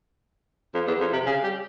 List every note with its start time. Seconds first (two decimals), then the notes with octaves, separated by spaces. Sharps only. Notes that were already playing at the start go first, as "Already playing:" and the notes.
0.74 F2
0.87 E2
1.00 F2
1.13 C3
1.26 C#3
1.44 G3